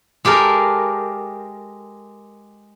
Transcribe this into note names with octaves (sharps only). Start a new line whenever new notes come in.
G#3 G4 A4 A#4